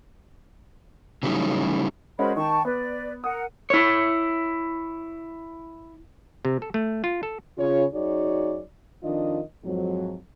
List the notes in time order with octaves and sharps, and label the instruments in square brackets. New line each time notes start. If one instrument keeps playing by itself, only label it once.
[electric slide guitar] C#3 E3 F#3 G3 A3 D#4
[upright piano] G#3 C#4 F#4 [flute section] A#4 C5 B5
[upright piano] D#3 [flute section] G5 A5 C#6
[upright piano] B3 [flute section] B4 D5
[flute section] A#4 F#5 [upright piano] D#6
[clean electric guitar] E4 C#5
[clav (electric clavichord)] C3
A4
A3
F4
A4
[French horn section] C#3 F4 C#5
F#2 D#4 F#4 G#4 C#5 D5
F2 D#3 D4 F4 D#5
F2 G#2 F#3